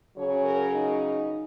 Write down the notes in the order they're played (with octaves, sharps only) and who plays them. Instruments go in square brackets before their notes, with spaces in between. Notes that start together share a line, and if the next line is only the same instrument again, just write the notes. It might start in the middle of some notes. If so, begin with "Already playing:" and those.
[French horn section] C#3 F#3 C#4 C#5
A#4
D#4